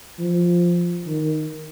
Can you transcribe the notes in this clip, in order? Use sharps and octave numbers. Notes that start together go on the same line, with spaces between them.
F3
D#3